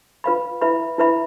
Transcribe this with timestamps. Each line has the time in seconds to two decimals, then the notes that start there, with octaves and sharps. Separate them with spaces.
0.24 F4 B4 F5 B5
0.61 E4 B4 E5 B5
0.98 E4 B4 E5 B5